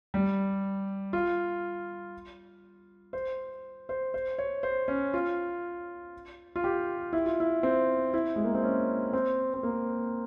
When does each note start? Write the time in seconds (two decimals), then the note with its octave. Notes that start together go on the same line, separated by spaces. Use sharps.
0.14 G3
1.13 F4
3.13 C5
3.89 C5
4.14 C5
4.38 C#5
4.63 C5
4.88 C#4
5.14 F4
6.56 F4
6.64 G4
7.13 E4
7.26 F4
7.40 E4
7.63 C4
8.14 E4
8.36 G#3
8.44 A#3
8.55 C4
8.63 C#4
9.13 C4
9.54 C4
9.63 A#3